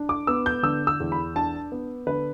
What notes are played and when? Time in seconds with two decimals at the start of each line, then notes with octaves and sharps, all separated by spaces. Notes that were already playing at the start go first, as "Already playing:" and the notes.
Already playing: D4
0.09 D6
0.27 B3 E6
0.46 G6
0.63 D3 E6
0.87 E6
1.00 E2
1.12 B5
1.35 D4 A5
1.72 B3
2.07 D3 B4